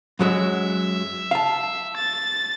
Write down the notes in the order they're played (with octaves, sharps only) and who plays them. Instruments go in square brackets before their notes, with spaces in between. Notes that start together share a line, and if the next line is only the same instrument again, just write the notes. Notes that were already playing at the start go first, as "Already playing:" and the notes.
[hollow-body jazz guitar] F#2 F#3 G#3 [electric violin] E5
[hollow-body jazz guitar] F5 A5
[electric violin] A6